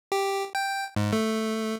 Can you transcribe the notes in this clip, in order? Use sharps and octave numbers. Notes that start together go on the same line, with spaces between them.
G4
G5
G#2
A3